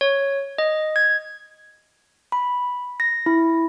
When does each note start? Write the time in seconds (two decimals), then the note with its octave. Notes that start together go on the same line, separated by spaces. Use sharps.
0.01 C#5
0.58 D#5
0.96 G#6
2.32 B5
3.00 A#6
3.26 E4